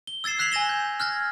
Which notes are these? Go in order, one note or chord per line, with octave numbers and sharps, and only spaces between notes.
G7
E6 G#6 A6 C7 E7
E6 F#6 B6 C7 F7 F#7
G#5 G#6 A#6 E7 G7
G6
F6 F#6 G#6 A#6